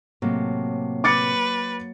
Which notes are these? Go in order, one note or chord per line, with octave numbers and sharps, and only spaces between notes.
A2 C3 F#3 A#3
B4 D6 A6 C#7